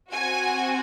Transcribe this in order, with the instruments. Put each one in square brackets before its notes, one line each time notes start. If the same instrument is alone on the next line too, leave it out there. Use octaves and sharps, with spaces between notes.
[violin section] C4 F#4 G#5